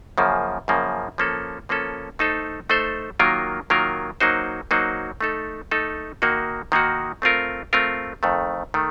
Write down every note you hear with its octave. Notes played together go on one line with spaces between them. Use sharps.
F#2 C#3 F3 A#3
F#2 C#3 F3 A#3
F3 A#3 C#4 A4
F3 A#3 C#4 A4
A3 D#4 A4 C5
A3 D#4 A4 C5
D#3 F#3 A#3 F4 A#4
D#3 F#3 A#3 F4 A#4
F#3 A#3 D#4 F#4 C5
F#3 A#3 D#4 F#4 C5
A3 D#4 A4
A3 D#4 A4
D#3 A#3 D#4 F#4
D#3 A#3 D#4 F#4
A3 C4 F4 A#4
A3 C4 F4 A#4
F2 D#3 A3
D#3 A3